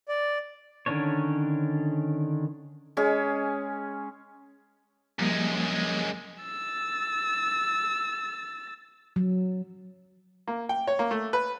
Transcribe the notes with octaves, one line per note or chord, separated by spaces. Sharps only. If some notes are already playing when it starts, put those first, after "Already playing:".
D5
D3 D#3 C#4 D4 C#5
G#3 C#4 G#4
F#2 F3 G3 G#3 A#3
E6 A6
F#3
A#3
G5
C#5
A#3
A3
B4